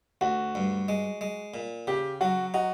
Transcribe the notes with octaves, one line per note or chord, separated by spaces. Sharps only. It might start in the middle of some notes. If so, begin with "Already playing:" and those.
D2 F#4
G2
G#3
G#3
A#2
C#3 G4
F#3 F#4
D#4 F#4